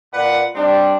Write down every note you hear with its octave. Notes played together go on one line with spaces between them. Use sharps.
A#2 B4 D5 F#5
G3 C4 D4